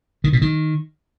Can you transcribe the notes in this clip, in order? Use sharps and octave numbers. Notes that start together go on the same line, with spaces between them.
D#3
B2
D#3